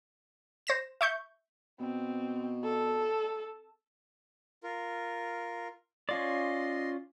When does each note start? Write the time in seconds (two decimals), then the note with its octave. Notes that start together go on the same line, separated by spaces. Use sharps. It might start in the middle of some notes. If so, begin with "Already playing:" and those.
0.67 C5 A#6 E7
1.01 E5 C#6 G6
1.80 B2 C4
2.64 A4
4.63 F4 A#4
6.09 C#4 F4 D5 D#5 C6